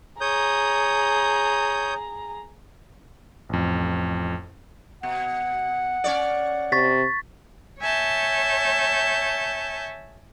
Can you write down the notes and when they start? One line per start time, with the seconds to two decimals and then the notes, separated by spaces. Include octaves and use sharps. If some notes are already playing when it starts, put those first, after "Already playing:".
0.21 G#4 C#5 A#5 D#6 G6
3.49 A1 F2
5.03 B2 F#5
6.04 C#4 C#5 D5
6.72 C3 C#6 A6 B6
7.80 C#5 E5 G#5 A5 G6